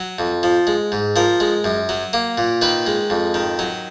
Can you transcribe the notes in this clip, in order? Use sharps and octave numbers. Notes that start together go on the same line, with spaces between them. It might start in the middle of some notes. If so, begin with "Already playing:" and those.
Already playing: F#3
F2
F3
G#3
G#2
F3 A#4
G#3
F#2
F#3
A#3
A#2
D#3 B4
G#3
F2
D#3
F#3